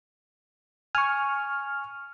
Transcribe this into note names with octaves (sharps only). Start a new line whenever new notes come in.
G#5 C#6 F6